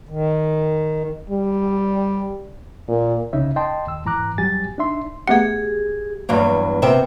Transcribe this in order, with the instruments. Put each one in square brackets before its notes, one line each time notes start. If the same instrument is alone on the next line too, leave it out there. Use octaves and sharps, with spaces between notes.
[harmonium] D#3
[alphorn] G3
A#2
[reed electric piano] C2 C#3 C#4 D#4 E5
D#5 G5 A5 C6
D#2 E6
E2 G#2 E3 A#5 D6 F#6
E2 F#3 G3 G4 G#5 A6
D4 D#4 E5 C6
[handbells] A3 B3 F#5 [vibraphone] G4 G#4
[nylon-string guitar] E2 G2 F#3 A#3
C3 B3 A#4 C5 E5 G5